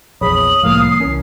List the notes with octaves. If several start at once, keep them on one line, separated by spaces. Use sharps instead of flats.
A#1 E2 G#4 C#5 B5 D#6
F#7
C2 A2 F3 A#3 F5
C7
C2 E3 C#4 A#4